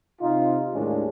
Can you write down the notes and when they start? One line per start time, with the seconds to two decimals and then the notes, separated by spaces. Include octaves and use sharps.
0.21 C3 D#4 F4
0.73 D#2 A2 C#3 G#3 C#4 D4